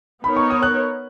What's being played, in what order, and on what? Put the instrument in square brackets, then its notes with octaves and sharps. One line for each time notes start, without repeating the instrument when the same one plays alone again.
[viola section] B3 D#4 A#4 C#5 [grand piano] B5
[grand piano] C#6
D#6
F#6